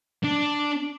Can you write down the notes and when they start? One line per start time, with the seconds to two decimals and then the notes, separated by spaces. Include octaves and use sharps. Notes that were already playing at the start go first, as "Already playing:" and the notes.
0.24 D4